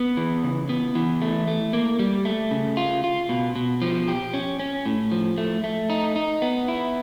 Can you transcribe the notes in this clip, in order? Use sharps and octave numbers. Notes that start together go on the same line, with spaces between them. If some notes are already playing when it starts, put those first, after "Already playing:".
Already playing: B3
E3
C#3
B3
E3
A3
A3
A#3
G3
A3
C#3
F4
F4
B2
B2
F3
G4
C#4
C#4
A2
F3
A3
A3
D#4
D#4
B3
E4